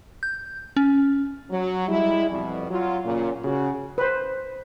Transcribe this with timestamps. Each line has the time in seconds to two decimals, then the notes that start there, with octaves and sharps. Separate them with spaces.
0.23 G6
0.77 C#4
1.51 F#3
1.88 G3 G#3 E4
2.30 F2 B2 G3
2.70 F#3 F4
3.04 A#2 C#3
3.43 C#3 F#4
3.98 B4 C5